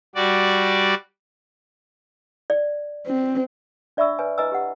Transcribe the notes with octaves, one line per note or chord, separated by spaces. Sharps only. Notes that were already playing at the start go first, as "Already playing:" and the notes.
G3 F#4 D5
D5
C4
D4 D5 E5 B5 C#6 E6
B4 C#5 G#5
E4 B4 D#5 G#5 A#5 E6
G4 F#5